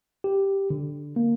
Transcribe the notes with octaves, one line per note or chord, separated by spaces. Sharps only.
G4
D3
A#3